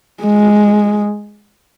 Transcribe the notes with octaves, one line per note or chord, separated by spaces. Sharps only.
G#3